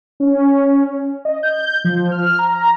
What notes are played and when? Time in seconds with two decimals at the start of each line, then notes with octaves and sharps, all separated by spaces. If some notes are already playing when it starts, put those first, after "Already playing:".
0.20 C#4
1.25 D#5
1.43 G6
1.84 F3
2.12 F6
2.39 A#5